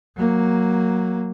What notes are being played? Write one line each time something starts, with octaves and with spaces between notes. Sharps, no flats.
F#3 A#3